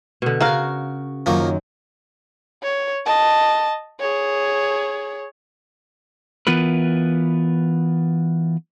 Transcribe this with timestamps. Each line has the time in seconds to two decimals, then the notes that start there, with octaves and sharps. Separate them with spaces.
0.22 B2 D3 C#6
0.40 C#3 F#4 A#4 F5
1.26 F#2 D#3 F3 F#3 A#3 C#6
2.63 C#5
3.06 D#5 A5
4.00 G#4 C#5
6.47 E3 B3 F4 A#4 B4